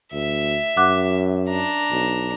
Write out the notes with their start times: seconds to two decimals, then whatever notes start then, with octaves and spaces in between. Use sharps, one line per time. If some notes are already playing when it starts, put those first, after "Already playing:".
0.13 D2 E5
0.77 F#2 F#5 D6 F#6
1.49 D4 A#5
1.91 B1